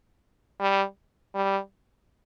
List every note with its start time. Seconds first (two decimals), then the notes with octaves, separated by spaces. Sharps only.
0.60 G3
1.35 G3